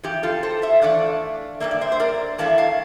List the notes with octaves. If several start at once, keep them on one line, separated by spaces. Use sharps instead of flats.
F2 E3 G4
F4 A4
A4 C5
C5 E5
E3 A3 D4 D5 F5
G2 E3 A#3 E5
D5
C5 E5
C5
A#4 D5
G2 E3 A3 E4 F5 A5
F5 A5